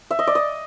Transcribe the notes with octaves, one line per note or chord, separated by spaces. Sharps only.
E5
D#5
D5
D#5